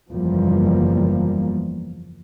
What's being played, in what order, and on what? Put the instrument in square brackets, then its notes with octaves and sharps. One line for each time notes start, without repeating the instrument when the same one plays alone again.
[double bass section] F#1 E2 F3 G3 A#3